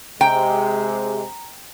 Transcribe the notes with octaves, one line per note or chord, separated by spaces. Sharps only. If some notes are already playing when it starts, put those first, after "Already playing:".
C3 G#3 G5 A#5